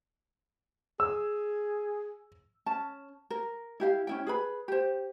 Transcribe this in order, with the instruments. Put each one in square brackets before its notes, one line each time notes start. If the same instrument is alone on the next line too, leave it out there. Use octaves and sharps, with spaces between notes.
[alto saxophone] G#4 [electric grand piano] E6
[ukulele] C#4 A5
A#4
E4 G4 F5
C#4 E4 G5
G#4 B4 B5
G4 C5